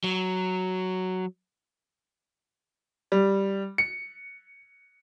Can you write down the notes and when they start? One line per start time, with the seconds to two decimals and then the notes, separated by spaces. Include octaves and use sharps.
0.04 F#3
3.12 G3
3.78 C#7